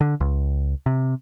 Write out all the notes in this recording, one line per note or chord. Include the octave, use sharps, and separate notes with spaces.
D3
C#2
C3